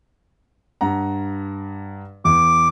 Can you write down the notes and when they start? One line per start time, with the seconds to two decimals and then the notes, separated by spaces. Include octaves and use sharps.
0.81 G2 F#5 A#5
2.25 E2 D6